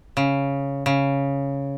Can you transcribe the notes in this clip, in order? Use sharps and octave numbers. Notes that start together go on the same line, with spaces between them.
C#3
C#3